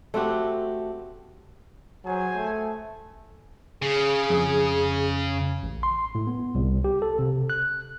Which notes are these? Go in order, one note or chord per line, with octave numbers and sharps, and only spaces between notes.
A3 C4 F#4 G4
F#3 G#4 C5 G#5
A3
C#3 G#4
F2
A1
C6
A2
B3
C2
G4
A4
C3
F#6